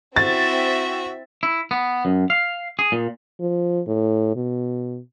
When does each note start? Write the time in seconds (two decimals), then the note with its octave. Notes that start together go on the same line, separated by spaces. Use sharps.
0.16 C4 E4 F#4 E5 A6
1.43 E4
1.71 B3
2.05 F#2
2.30 F5
2.79 G#4
2.92 A#2
3.40 F3
3.88 A2
4.36 B2